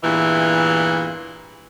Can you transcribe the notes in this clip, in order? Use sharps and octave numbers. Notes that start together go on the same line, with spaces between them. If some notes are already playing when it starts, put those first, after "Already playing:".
E2 G2 A#2 E3